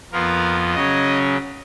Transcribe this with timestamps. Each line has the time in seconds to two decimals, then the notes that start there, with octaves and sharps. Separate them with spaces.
0.12 F2 F3 B3 F4 A#4
0.75 C#3 F#3 C#4 D#5